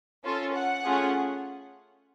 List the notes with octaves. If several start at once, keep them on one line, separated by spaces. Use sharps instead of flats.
C#4 F4 A4
F#5
A3 C#4 F4 G#4